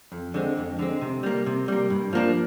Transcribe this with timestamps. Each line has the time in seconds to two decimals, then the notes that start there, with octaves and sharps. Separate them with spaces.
0.12 F2
0.34 D3 G#3 C4
0.57 F2
0.79 D3 G#3 C4
1.01 C3
1.23 G3 A#3
1.46 C3
1.68 G3 A#3
1.90 G2
2.13 F3 A#3 D4